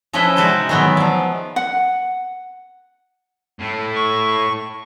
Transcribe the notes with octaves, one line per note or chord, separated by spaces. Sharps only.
F3 C#4 E4 A4 B4 D#5
C3 G#3 D#4 F#4 D5
D#3 E3 F#3 G#3 B3
F3 D5
F#5
A2 A3
C#6